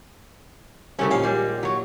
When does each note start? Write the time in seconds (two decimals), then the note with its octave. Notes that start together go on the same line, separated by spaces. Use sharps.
0.99 C2 C#3 A3 C#4
1.11 A#1 D#2 C#4 F5
1.23 G3 G#3
1.63 F#3 C#5